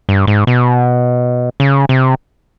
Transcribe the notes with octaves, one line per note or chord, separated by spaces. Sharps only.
G2
G#2
B2
C#3
C3